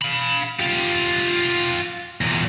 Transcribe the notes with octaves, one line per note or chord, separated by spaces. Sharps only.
F5 B5
F4 G4
E2 A#2